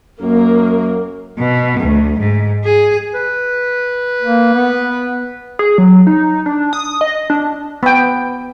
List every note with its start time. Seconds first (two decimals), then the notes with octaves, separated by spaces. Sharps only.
0.21 F#2 A#3 A#4
1.38 B2
1.80 D2
2.19 G#2
2.64 G#4
3.14 B4
4.22 A#3
4.54 B3
5.59 G#4
5.78 F#3
6.07 D#4
6.46 D4
6.73 D#6
7.01 D#5
7.30 D4
7.83 B3 G5